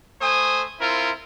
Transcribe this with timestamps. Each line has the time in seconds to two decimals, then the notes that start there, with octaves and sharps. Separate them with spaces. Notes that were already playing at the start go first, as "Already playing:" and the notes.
0.21 A3 C5 G#5 D#6
0.80 C4 E4 F4 A#4